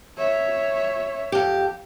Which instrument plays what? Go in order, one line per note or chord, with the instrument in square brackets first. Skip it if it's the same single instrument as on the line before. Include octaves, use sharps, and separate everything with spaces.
[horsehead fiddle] C#5 E5
[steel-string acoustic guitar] F2 G4